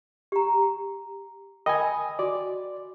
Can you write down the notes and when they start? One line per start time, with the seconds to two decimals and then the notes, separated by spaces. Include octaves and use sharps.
0.32 G4 A#5
1.66 A#4 D#5 G5 G#5 B5
2.19 F#4 D5